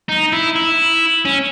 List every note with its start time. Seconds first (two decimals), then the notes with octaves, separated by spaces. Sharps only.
0.09 D#4
0.32 E4
0.55 E4
1.25 C#4